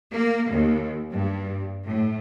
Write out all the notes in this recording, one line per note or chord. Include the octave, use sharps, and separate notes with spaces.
A#3
D#2
G2
A2